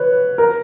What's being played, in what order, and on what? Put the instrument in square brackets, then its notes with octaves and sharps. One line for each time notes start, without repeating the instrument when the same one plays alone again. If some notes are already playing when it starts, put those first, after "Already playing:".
Already playing: [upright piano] B4 C#5
A#4